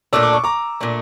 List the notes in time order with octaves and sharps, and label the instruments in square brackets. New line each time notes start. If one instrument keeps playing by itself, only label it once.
[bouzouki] A#2 A3 D4 [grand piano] E6
[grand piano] D6
C#6
A#5 D6
[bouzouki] A#2 A3 D4